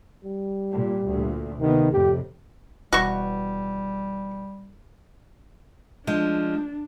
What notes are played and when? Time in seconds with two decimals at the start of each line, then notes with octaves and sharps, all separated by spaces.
0.25 G3
0.72 A#2
1.09 D2 A#2
1.61 C3 D#3 B3
1.92 F2 A2 C3 G4
2.93 E1 G3 F#4 C#6
6.07 F3 G#3 D4